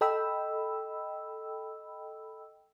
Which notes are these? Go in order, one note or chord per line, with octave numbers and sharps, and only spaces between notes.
A4 D#5 G5 B5 E6